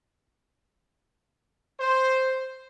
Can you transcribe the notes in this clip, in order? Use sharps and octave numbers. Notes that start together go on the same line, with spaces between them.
C5